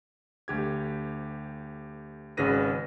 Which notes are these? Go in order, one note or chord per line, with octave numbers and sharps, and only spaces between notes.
D2 G4 G#6
G#1 C#3 F#4 B4 A#6 D#7